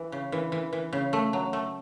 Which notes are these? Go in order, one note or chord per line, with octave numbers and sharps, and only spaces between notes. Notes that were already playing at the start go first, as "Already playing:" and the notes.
Already playing: E3
C#3
E3
E3
E3
C#3
A3
F#3
A3